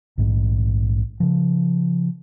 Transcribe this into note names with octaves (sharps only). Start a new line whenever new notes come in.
A#1 G#2
C#3 F3